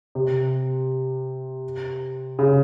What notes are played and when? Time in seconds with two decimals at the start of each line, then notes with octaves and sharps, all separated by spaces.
0.15 C3
2.39 C#3